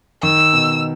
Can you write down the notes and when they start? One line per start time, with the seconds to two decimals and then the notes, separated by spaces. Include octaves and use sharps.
0.23 D#3 E6
0.53 B2